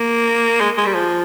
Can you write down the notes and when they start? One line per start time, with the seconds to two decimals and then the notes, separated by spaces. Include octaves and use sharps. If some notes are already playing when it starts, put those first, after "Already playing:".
Already playing: A#3
0.60 G#3
0.77 G#3
0.86 G3
0.94 F3